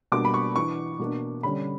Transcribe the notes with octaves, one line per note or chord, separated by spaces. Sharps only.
B2 G3 A#3 D4 D6
B5
C#6
E3 B3 D4 C#6
B2 A#3 D4
D3 G3 C#4 B5